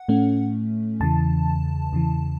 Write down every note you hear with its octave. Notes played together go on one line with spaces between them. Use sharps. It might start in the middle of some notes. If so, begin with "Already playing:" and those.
Already playing: F#5
A2 A3 C#4
E2 C#3 E3 A5
E2 C#3 E3